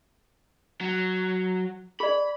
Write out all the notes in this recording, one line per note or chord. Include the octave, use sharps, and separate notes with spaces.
F#3
G#4 D5 B5